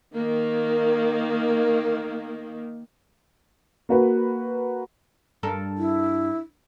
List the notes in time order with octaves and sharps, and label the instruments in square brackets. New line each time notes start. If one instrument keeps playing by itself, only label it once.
[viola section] D#3 A#3
[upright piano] A#3 F#4 B4
[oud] G2 A4 A#4
[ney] E4